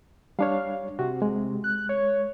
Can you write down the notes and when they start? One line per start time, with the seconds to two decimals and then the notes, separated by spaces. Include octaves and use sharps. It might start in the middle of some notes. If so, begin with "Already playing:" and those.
0.39 G3 D4 C#5 F5
0.99 C3 F#4
1.22 G#3
1.64 F#6
1.89 C#5